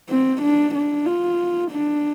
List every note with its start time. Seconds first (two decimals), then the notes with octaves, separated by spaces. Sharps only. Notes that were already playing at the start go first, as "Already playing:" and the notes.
0.10 C4
0.42 D4
0.75 D4
1.06 F4
1.71 D4